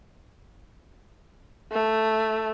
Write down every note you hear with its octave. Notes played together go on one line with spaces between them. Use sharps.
A3